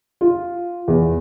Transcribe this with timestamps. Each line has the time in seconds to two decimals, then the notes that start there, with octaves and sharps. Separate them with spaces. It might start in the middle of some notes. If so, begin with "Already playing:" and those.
0.21 F4
0.88 E2